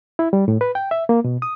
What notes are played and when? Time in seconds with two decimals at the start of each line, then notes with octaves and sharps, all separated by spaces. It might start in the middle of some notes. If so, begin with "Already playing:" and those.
0.19 E4
0.33 G3
0.48 A2
0.61 B4
0.75 G5
0.91 E5
1.09 A#3
1.24 B2
1.42 D#6